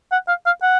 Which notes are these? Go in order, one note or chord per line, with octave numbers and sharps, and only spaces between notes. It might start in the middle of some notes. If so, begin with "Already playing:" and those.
F#5
F5
F5
F#5